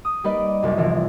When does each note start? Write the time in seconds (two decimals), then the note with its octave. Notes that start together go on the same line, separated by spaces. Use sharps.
0.05 D#6
0.24 G3 A#3 D#4 B4 D5 D#5
0.63 C2 F#2
0.76 G1 C2 C3 E3 F3